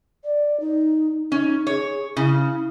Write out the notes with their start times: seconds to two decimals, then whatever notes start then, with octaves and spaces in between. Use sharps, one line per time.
0.24 D5
0.60 D#4
1.32 C#4 D#4
1.67 G#4 C#5
2.16 C#3 E4